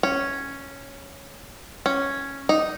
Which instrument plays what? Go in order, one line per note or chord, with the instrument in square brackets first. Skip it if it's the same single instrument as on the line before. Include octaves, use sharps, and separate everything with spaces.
[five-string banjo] C#4
C#4
D#4